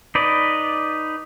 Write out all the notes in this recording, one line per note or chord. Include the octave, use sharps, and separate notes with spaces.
D#4 B4 D5